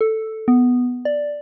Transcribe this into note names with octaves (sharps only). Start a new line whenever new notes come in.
A4
B3
D5